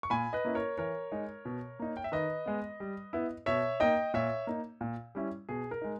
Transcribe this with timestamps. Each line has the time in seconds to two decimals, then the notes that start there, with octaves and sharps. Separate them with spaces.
0.03 C#6
0.10 A#2 G#5 B5
0.33 B4 D#5
0.45 A#3 C#4 E4
0.55 A#4 C#5
0.78 E3 A#4 C#5
1.12 G#3 D#4
1.45 B2
1.79 A#3 D#4
1.97 G5
2.04 E5
2.12 D#3 B4 D#5
2.46 G#3 B3
2.80 G3
3.13 B3 E4
3.46 B2 C#5 E5
3.80 A#3 D#4 D#5 G5
4.14 A#2 C#5 E5
4.47 A#3 D#4
4.81 A#2
5.15 G3 C#4 E4
5.49 B2 G#4
5.71 A#4
5.82 G#3 D#4